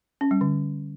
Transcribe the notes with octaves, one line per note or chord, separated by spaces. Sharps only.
C#4
G3
D3